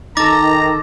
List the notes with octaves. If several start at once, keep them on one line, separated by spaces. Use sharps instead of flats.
D#3 D#4 A4 A#5 D6 A6 A#6